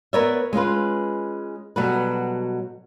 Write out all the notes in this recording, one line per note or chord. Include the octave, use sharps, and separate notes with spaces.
B3 A#4 B4 C#5 D5 E5
G#3 C#4 F4 B4
B2 F#3 G3 F#4 A4 B4